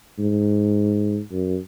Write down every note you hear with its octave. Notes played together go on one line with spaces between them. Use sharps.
G#2
F#2